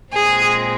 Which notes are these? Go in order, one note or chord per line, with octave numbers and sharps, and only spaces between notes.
A#2 G#3 C4 G#4